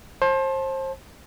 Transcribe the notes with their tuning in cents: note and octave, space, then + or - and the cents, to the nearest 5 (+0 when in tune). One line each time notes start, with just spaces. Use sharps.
C5 +30 A5 -15